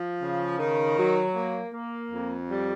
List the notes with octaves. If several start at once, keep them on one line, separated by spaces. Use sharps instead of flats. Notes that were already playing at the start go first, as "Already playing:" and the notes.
Already playing: F3
C#3
D#3
F#3
A#3
A#3
F2
G3